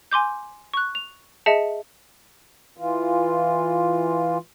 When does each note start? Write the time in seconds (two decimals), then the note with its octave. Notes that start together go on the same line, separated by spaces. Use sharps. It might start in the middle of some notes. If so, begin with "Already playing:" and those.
0.11 G#5 C6 D6 G6
0.74 C#6 F#6
0.95 F7
1.46 G#4 D#5 E5 A5 C#7
2.77 E3 F4